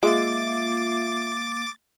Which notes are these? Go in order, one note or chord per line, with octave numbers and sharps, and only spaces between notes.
G#3 A#3 F4 E5 D6 A6